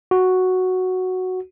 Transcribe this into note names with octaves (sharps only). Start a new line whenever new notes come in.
F#4